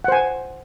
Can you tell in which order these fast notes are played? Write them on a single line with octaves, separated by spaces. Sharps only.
F#5 C5 G#5